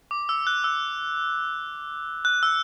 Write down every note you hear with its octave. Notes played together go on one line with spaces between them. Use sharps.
D6
E6
F#6
E6
F#6
E6